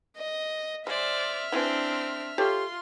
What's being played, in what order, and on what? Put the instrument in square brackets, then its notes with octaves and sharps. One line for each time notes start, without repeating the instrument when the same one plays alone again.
[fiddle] D#5
[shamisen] G#3 [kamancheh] C5 D5 [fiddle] E5 F6
[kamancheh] C4 D4 [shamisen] E4 G#4 B4
[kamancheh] F4 C6 [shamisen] G4 A4 C#5